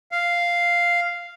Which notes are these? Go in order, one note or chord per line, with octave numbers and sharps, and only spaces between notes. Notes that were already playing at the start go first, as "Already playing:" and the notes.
F5